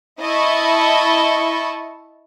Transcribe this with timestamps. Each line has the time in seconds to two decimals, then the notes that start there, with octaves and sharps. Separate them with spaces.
0.21 E4 D#5 A5 C#6